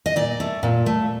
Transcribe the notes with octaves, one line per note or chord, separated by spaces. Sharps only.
D#5
A#2 D5
A3
A#2
A3